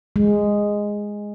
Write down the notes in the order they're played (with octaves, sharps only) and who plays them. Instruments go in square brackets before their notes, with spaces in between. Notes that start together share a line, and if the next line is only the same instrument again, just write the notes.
[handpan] G#3